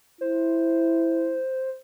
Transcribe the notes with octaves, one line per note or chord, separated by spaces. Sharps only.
E4 C5